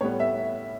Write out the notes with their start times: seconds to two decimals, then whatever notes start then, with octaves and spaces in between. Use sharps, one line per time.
0.01 A2 G3 B3 C#5
0.20 E5